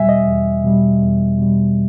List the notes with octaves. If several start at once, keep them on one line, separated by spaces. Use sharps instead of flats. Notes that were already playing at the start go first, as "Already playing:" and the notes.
Already playing: E2 B2 G3 E5 G#5
D#5
E2
B2 G3
E2
B2 G3